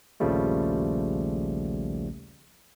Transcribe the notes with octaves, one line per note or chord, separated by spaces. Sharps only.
A#1 D#2 C#3 F3 G3 A3